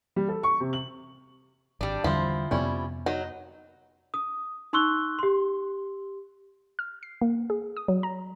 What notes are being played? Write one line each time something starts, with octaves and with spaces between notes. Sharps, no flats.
G3
A4
C#6
C3
F#7
G#1 G3 D4
E2 D3 F3 G3 C4 E4
F2 C3 G3 B3 C#4 E4
F#3 D#4
D#6
D#4 C6 C#6 E6 F#6 G7
G4 C6
F6
C7
A#3
G#4
D#6
F#3
A#5